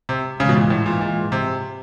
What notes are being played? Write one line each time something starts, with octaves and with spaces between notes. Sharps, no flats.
C3
G#2 C#3 E3 G#3
B2
A#2
A2
A#2
A#2
C3